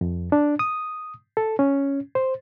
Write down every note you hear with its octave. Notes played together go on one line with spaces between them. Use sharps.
F2
D4
D#6
A4
C#4
C5